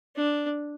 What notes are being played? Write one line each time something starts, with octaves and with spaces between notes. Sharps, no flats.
D4